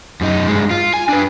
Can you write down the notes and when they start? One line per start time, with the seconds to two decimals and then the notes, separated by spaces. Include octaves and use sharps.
0.21 F#2 D#4
0.47 G2 G#3
0.70 F4
0.94 G#5
1.09 D4 B4